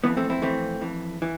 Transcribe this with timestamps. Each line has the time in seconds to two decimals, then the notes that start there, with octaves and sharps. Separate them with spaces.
0.04 F2 E3 B3
0.17 A3 C4
0.30 C4 E4
0.42 F2 E3 A3 C4
0.81 F2 E3
1.22 E3